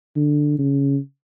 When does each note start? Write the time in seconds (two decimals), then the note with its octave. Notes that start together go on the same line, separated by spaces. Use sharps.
0.16 D3
0.58 C#3